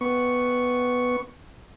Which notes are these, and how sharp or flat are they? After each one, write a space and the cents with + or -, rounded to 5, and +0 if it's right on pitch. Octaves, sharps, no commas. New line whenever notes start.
B3 +0 C#6 +0